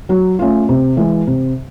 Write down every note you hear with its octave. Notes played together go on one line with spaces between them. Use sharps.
F#3
A3 C#4 F4
C3
E3 G#3
C3